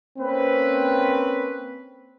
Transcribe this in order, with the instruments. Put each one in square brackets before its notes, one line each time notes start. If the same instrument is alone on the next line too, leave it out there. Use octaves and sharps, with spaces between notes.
[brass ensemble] A#3 C4 C#4 B4